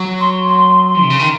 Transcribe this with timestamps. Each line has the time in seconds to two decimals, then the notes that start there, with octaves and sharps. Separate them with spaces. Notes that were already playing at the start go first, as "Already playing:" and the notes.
Already playing: F#3
0.19 C6
0.47 C6
0.87 C6
1.02 C3
1.10 C#3
1.19 D#3